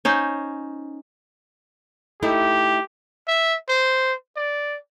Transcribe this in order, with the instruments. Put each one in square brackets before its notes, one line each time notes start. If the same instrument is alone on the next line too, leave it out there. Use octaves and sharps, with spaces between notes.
[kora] C#4 D#4 C5
[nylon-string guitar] A3 D#4 E4 [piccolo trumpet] G4
[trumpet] E5
C5
D5